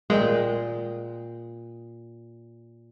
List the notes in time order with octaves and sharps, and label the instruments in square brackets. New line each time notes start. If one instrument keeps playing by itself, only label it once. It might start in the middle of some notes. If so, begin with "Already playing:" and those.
[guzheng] A#2 G5 [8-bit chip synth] G#3